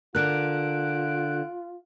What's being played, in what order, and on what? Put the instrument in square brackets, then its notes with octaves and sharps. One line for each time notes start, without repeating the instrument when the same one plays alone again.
[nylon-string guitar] D3 A#4 [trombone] F4 [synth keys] F#6 D7